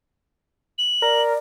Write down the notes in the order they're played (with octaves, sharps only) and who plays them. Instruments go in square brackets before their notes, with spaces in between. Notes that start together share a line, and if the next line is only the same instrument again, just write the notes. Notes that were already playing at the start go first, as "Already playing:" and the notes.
[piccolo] F#7
[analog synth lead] A#4 [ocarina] D5